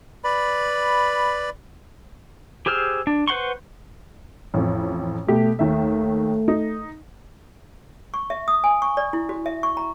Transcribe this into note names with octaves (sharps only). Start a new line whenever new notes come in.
B4 D5 B5
G4 G#4 C5 E6 F6
D4
B4 C5 F#5 C6 C#6
A1 F2
B2 A3 G4
D#2 D#3 A3 E5
D#4
C#6
E5
D#6
G#5
C#6
D5
E4
F#4
E5
C#6
A#5